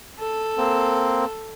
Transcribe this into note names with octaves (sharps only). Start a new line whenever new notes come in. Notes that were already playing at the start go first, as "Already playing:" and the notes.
A4
A#3 C4